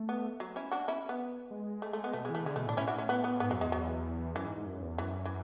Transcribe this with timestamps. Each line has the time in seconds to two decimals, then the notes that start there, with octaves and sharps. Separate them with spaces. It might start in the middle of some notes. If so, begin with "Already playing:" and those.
Already playing: A3
0.09 B3
0.40 F#3
0.56 C#4 E4
0.71 D4 F#4
0.88 C#4 E4
1.09 B3
1.51 G#3
1.82 A3
1.93 A3
2.04 B3
2.13 B2 A3
2.25 G#3
2.30 E3 A3
2.45 D3 G#3
2.56 B2 A3
2.66 A2 D4
2.77 A2 C#4 E4
2.87 D4 F#4
2.98 A3 C#4
3.09 B3
3.24 B3
3.40 G#2 B3
3.51 F#2 F#3
3.61 E2 G#3
3.72 F#3
4.35 F#2 E3
4.46 G#2
4.57 G#2
4.66 F#2
4.82 E2
4.98 F#2 E3
5.25 E3